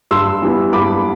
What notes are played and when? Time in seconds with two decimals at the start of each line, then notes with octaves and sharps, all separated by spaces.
0.11 G2 C6 E6
0.42 E3 G3 B3
0.73 G2 B5 D6